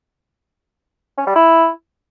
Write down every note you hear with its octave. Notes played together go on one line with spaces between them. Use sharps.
C#4
G3
E4